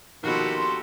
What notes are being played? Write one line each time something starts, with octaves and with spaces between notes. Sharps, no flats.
A#1 B2 D#3 F#4 G4 A4 C6